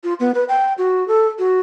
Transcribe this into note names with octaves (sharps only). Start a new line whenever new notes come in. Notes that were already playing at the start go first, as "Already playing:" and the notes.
F4
B3
B4
G5
F#4
A4
F#4